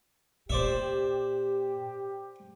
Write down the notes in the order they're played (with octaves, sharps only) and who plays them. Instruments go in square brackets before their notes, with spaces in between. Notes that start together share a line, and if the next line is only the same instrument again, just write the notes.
[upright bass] A#2 [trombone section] G4 [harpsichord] C5 D5 E5